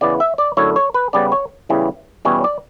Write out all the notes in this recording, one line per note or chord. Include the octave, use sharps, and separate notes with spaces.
C#3 E3 B3 D5
E5
D5
F#2 D3 A3 E4 C#5
C#5
B4
C#3 G3 B3 D5
C#5
E2 C#3 E3 G3
E2 B2 G3 C#4 E4 C#5
D5